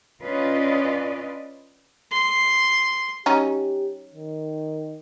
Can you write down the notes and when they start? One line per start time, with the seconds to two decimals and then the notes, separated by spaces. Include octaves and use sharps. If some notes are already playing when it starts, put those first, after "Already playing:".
0.22 C#4 D4 F4 B4 D5 D#5
2.12 C6
3.26 F#3 C#4 D#4 G4
4.14 D#3